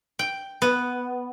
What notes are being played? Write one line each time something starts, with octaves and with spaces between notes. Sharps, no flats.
G5
B3